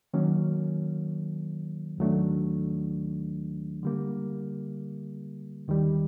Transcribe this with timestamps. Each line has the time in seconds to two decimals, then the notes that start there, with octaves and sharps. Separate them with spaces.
0.14 D#3 F#3 A#3 C#4
1.98 D#2 D#3 F#3 A3 D4
3.83 D3 G3 A#3
5.68 D#2 D#3 G3